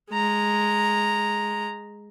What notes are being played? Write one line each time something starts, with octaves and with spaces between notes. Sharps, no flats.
G#3 A#5